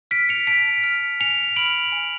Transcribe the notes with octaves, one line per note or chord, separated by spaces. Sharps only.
F6 B6 D7
C#7 F7
A5 B6 D7
F6
G#5 C#7 F7
B5 F6 D7 F#7
G#5